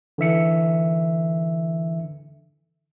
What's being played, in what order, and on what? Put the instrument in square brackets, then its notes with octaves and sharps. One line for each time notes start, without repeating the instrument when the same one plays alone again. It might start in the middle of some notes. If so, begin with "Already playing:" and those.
[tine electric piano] D3 E3 E5 C#7